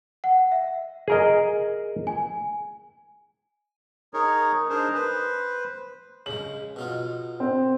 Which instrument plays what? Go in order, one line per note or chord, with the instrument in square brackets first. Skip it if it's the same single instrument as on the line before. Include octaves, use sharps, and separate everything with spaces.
[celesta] F#5
E5
[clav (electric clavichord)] G#4 A#4 D#5
[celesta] G#5
[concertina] D#4 G#4 A#4 C#5
D4 D#4 G#4 A#4 C5
B4 C5
[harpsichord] C#3 G#3 [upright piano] F#7
[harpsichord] B2 D#4 F4
[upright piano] C4